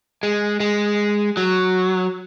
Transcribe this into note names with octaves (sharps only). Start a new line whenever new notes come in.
G#3
G#3
F#3